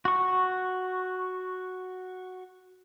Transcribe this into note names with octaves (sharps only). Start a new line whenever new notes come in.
F#4 C#6